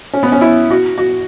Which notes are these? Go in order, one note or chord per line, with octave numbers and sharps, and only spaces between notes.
C#4
B3
C#4
E4
F#4
F#4